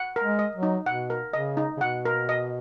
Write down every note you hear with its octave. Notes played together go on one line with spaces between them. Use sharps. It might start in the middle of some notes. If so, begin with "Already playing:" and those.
Already playing: F#5
A#4
G#3
D#5
F#3
D#4
B2 F#5
A#4
C#3 D#5
D#4
C#3
B2 F#5
A#4
D#5